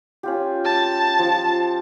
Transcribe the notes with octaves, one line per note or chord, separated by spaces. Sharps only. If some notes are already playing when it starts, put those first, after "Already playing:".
C#4 F4 G4
A5
F3